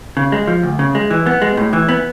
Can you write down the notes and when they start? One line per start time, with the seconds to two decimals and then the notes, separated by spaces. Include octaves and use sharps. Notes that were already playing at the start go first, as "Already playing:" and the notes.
0.17 C#3
0.32 G#3
0.47 F3
0.63 D2
0.79 C#3
0.95 G#3
1.11 E3
1.27 B3
1.42 G#3
1.57 A2
1.73 E3
1.89 B3